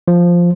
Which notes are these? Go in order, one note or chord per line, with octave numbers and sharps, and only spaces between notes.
F3